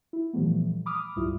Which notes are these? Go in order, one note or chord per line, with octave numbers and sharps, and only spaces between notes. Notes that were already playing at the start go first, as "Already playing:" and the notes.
E4
A#2 E3 F3 G3 A3 B3
B5 D6 D#6 F6
C2 G2 G3 E4 F4